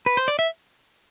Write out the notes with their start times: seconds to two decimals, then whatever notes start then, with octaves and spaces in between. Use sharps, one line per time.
0.06 B4
0.17 C5
0.28 D5
0.39 E5